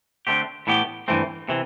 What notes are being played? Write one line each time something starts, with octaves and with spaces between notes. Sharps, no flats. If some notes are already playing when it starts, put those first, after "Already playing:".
D3 A3 C4 G4
A2 E3 B3 E4 G4
G2 E3 A3 C4
C3 E3